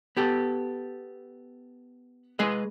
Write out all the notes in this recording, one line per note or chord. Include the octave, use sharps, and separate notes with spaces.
B3 G4 A4
G#3 G#4 B4 D#5